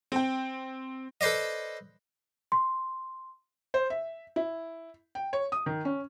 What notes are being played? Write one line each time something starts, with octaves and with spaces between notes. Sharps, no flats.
C4 G5
A4 B4 C5 D5 D#5
C6
C5
E5
E4
G5
C#5
D#6
D#3
C#4